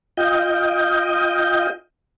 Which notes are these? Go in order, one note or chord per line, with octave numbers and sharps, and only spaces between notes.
F4 D#5 G5